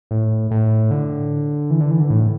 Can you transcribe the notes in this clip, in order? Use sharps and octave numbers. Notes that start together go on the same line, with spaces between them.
A2
A2
D3
E3
D3
E3
D3
A2